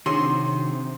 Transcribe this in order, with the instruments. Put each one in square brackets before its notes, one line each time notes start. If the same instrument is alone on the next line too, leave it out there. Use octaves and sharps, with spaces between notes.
[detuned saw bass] C3 [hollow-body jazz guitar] D#3 F#4 G#4 [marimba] D4 E4 C#5 [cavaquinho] C6